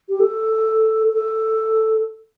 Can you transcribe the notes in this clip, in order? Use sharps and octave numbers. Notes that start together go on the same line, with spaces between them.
G4
A4
A4